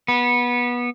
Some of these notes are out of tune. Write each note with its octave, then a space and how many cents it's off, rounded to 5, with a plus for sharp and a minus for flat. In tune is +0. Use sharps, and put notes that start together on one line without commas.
B3 -20